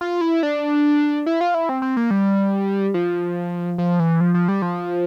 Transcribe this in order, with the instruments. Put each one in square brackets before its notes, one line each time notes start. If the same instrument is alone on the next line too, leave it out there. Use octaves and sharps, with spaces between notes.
[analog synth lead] F4
E4
D4
E4
F4
E4
C4
C4
A#3
G3
F3
F3
E3
F3
F3
G3
F3